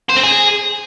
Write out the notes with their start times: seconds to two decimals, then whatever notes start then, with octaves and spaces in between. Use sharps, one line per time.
0.10 C5
0.16 C4
0.23 G#4